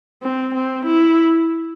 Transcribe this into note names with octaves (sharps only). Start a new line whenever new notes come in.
C4
C4
E4